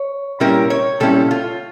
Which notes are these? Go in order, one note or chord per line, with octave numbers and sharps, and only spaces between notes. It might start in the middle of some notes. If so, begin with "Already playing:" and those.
Already playing: C#5
A#2 G3 C#4 E4 A#4
C#5
A#2 G3 C#4 E4 A4
F4